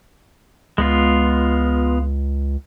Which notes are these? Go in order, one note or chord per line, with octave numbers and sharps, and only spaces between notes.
C#2 G#3 B3 F4